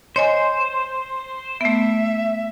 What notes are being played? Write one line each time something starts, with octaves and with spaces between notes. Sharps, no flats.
C5 C#5 D#5 G#5
A3 B3 E5